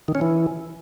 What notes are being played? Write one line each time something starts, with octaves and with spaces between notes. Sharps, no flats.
D#3
C#4
E3